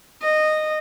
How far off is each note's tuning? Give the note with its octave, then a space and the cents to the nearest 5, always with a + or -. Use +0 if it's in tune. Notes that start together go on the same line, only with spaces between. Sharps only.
D#5 -15